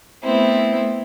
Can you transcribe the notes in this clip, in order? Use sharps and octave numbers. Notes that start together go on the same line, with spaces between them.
A3 B3 C4 E4